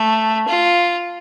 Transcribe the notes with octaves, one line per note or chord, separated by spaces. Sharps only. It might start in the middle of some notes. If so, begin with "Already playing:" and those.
Already playing: A3
F4